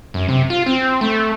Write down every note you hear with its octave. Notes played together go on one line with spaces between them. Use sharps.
F#2
C3
F4
C4
A3